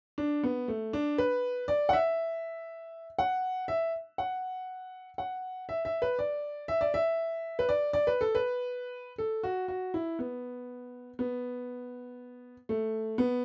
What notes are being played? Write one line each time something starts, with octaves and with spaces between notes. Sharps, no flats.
D4
B3
A3
D4
B4
D5
F#5
E5
F#5
E5
F#5
F#5
E5
E5
B4
D5
E5
D5
E5
B4
D5
D5
B4
A4
B4
A4
F#4
F#4
E4
B3
B3
A3
B3